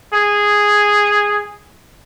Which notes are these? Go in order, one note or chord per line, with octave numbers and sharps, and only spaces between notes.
G#4